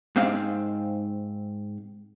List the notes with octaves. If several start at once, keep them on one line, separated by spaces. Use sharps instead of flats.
G#2 C4 F5